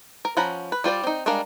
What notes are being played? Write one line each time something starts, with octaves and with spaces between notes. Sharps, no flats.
A#4
F3 C#4 F#5 A#5 B5
B4
G3 F4 C5 D5
C4 D#4
G3 G#3 D4 A#4 F5